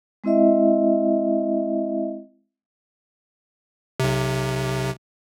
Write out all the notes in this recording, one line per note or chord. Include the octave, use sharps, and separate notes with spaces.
G#3 C4 E4 D#5 E5
B1 C3